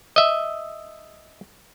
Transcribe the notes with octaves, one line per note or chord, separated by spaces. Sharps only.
D#5 E5